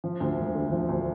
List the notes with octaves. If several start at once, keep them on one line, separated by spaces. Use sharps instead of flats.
F3
D2
E1
D3
F3
D2